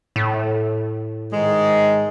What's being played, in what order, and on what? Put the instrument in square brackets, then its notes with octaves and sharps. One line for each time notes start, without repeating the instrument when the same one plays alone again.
[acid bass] A2
[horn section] G#2 D#3 G#3